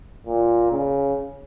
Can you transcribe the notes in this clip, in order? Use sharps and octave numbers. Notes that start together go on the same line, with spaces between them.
A#2
C#3